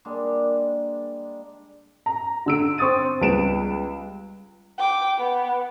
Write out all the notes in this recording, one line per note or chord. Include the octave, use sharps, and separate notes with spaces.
G3 G#3 A#3 D4
A#5
D3 E6 D7
C4 C#6 D#6 A6 D#7
C#2 G3 B3 D7 E7
G5 D6
B3